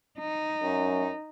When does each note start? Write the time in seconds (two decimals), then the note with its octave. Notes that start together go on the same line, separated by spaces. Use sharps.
0.19 D#4
0.63 F#2